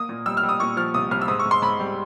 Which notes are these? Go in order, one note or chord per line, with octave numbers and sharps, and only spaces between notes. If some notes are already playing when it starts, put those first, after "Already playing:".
Already playing: A#3 D#6
A#2
G3 E6
F6
G3
D#6
A#2 C#6
F3 F6
C2 D#6
C2 F6
E6
G#2 D#6
C#6
G#2
C6
G#2 B5
G3